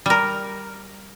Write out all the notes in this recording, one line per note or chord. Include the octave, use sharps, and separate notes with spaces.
G3 A#4